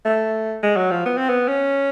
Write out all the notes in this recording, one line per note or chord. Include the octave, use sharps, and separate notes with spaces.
A3
G#3
F#3
F3
B3
C4
B3
C#4